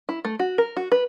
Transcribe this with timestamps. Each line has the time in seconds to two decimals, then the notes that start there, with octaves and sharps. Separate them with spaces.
0.09 E4
0.25 A3
0.39 F#4
0.58 A#4
0.77 F#4
0.92 B4